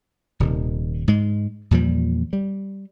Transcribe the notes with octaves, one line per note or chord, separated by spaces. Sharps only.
D#1 C3 D#3
G#2 G#3
E2 A#2 F3 G3
G3